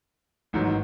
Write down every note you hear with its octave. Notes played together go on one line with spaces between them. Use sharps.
A1 G#2 D#3 F#3